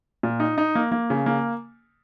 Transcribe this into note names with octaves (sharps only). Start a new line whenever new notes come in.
A#2
D#4
D#4
A#3
A#3
C#3
A#3